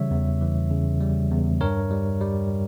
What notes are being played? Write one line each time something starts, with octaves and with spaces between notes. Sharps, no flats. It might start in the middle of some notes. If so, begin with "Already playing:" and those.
Already playing: C#3 E3 G3 C#5 E5
E2
E3
C#3
G3
E2
G2 A#4 C#5
G3
G3